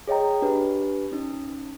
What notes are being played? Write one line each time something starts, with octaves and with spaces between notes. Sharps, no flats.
G#4 C#5 D#5 G5 A#5
D4 G4 B4
C#4 D#4